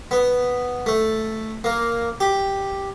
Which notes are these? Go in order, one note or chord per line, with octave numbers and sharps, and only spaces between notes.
B3
A3
A#3
G4